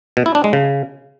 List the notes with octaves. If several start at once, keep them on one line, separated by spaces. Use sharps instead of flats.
B2
E4
D4
G#3
C#3